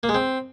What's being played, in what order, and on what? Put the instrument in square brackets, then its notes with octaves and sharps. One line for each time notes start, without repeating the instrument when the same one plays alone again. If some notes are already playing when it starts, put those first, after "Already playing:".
[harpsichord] A#3
G#3
C4